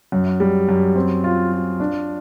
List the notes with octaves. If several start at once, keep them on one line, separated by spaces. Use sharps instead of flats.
F#2
G3
F#2
C4
F4
F4
D4